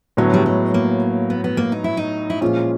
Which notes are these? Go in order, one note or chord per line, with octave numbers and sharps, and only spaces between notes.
A2 D3 F#3 B3
G3
G#3
A#3
B3
B3
A#3
D#4
E4
D#4
E4
A#2 F3 G#3 C#4 F4